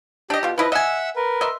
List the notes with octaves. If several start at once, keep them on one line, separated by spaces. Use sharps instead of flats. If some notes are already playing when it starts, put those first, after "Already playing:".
D4 G4 D#5
B2 F4
F3 E4 B4 D#5
D#5 E5 F#5 G#5 E6
A#4 B4
D#5 E5 C6